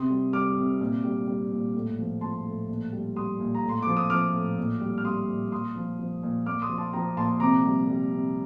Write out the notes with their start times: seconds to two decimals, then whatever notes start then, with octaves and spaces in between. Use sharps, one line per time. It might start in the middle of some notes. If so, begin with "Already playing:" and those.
Already playing: C3 C6 D#6
0.10 G3
0.33 G3 D6 F6
0.57 C3
0.81 A#2
1.04 G3
1.27 G3
1.51 A#2
1.74 A2
1.99 F3
2.21 F3 A5 C6
2.46 A2
2.69 A#2
2.92 G3
3.16 G3 C6 D#6
3.40 A#2
3.55 A#5
3.64 A2
3.69 C6
3.82 F3 D6
3.97 D#6
4.10 F3 D6 F6
4.34 A2
4.58 A#2
4.81 G3
4.98 F6
5.04 G3 C6 D#6
5.28 A#2
5.52 A#2 C6 D#6
5.76 F3
5.99 F3
6.23 A#2
6.46 A#2 D6 F6
6.62 C6 D#6
6.69 F3
6.78 A5 C6
6.93 F3 G5 A#5
7.17 A#2 A5 C6
7.40 C3 A#5 D6
7.65 G3
7.88 G3
8.11 C3